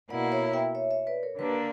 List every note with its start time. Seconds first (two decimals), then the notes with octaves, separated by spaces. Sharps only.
0.10 B2 A#3 E4 D5 F#5
0.32 C#5 E5
0.53 E5 G5
0.75 C#5 E5
0.91 C#5 E5
1.07 B4 D5
1.23 A#4 C#5
1.39 D3 A#3 D4 G4 B4